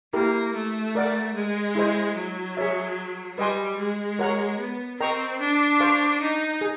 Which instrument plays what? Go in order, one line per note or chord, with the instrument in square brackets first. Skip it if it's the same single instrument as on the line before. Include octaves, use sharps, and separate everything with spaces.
[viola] A#3 [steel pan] E4 G4 A#4
[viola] A3
[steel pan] A#4 D5 F#5
[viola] G#3
[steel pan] E4 G#4 C5 D#5
[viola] F#3
[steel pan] G#4 C#5 E5
[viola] G3 [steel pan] B4 D#5 G#5 C6
[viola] G#3
[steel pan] F#4 A#4 C#5 F#5 A#5
[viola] B3
[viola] C4 [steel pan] A#4 D#5 G5 A#5 C#6
[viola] D4
[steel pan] C5 F5 A5 C#6
[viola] D#4
[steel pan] G#4